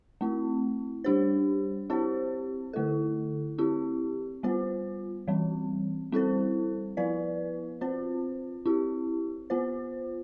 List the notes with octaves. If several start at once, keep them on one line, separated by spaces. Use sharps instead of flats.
A3 C4 E4
G3 D4 G4 C5
C4 E4 G4 C5
D3 A3 E4 A4
C4 E4 G4
G3 B3 F4 C5
E3 G3 C4
G3 C4 E4 A4 C5
F3 B3 E4 B4 D5
C4 F4 C5
C4 E4 G4
B3 F4 C5